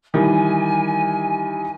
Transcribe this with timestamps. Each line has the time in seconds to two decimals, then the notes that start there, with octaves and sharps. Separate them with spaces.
0.14 D#3 E3 G3 G#5